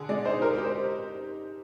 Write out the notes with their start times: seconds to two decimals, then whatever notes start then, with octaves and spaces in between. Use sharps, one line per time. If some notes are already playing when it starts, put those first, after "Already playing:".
Already playing: D3 G#4
0.09 G#3 D5
0.25 D#4 C5
0.42 G4 A#4
0.58 G4
0.64 C5